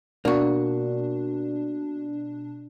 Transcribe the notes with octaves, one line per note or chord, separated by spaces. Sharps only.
B2 A#3 D4 F#4